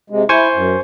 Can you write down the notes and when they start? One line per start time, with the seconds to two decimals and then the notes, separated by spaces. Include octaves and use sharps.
0.10 C3 G#3
0.29 E4 C5 G#5 C#6
0.55 F#2